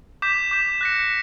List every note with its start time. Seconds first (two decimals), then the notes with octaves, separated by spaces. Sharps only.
0.22 D6 G6 B6 E7
0.51 D6 G6 B6 E7
0.81 F#6 A#6 C#7